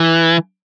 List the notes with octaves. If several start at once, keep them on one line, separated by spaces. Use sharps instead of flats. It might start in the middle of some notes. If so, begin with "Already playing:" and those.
Already playing: E3